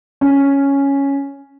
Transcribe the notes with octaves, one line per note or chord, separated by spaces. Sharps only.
C#4